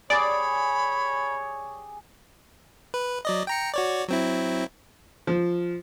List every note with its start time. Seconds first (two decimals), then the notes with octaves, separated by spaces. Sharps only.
0.10 G4 G#4 C#5 D5 B5
2.94 B4
3.25 F#3 D5 D#5
3.47 G5 A#5 C#7
3.74 F#4 C#5 D5
4.08 F#3 C4 E4
5.27 F3